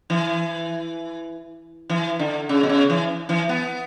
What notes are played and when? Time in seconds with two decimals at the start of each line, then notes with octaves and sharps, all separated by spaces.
0.10 E3
1.90 E3
2.19 D3
2.49 C#3
2.63 B2
2.69 C#3
2.90 E3
3.29 E3
3.49 B3